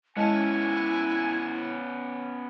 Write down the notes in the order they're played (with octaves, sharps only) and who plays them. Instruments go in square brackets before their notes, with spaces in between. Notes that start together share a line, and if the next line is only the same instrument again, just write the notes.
[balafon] G#3 D#5 A5 [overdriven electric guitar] B3 C#4 [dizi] E4 [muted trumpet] G#5